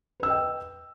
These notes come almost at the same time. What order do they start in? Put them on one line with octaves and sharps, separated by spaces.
B4 E6 D#5 G5